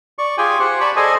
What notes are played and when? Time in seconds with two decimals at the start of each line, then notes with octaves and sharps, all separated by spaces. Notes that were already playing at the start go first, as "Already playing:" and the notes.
0.19 D5 C#6
0.38 F4 G4 G#4 G5 G#5
0.60 G4 C5 F#5
0.81 G4 D5 A5 B5 C#6
0.96 G#4 A4 C5 D5 D#5 G#5